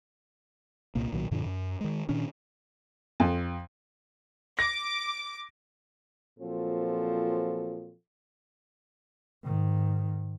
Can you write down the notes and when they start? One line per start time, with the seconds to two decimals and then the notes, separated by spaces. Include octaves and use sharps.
0.95 C2 A#2 A#3
1.12 B1 A#2 D#3 F#3
1.31 F#2 A#2 D3 F3
1.46 F#2
1.81 D#3 G#3
2.09 A#2 D#3 C#4 D4
3.20 F2
4.59 D6 A#6
6.40 A#2 F3 F#3 C4 A4
9.44 G#2 D#3